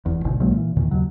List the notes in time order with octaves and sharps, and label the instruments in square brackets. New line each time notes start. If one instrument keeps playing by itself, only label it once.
[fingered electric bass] F1 E2
G#1 D2 G#2 B2
B1 F#3 G#3 A#3
A#2 E3
E2 A#2 D#3 E3
D#2 C#3 F#3